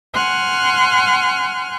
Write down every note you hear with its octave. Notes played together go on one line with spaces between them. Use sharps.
F#5 G#5 C6 F6 F#6